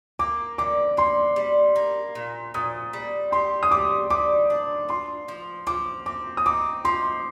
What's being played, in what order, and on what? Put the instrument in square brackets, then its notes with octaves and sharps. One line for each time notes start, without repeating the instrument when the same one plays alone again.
[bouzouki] A#3 [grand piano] D6
[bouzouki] D3 [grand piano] D6
[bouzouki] D3 [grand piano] C6
[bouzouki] G3
A#3
A#2
[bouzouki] A#2 [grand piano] D#6
[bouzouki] G3
[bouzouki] G4 [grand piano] C6
[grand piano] D#6
[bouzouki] G3 [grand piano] D6
[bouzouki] G3 [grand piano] D6
[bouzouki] D4
[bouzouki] F4 [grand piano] C6
[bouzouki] F3
[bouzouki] F3 [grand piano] D6
[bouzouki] C4 [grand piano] D6
[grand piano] D#6
[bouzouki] D#4 [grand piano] D6
[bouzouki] F3 [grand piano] C6